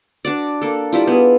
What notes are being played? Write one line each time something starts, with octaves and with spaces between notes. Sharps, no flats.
D4 F#4 D5
A#3 A4
G3 E4 F4
B3 G#4